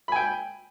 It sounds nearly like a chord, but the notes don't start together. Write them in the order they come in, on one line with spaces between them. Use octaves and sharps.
B5 G#5 G5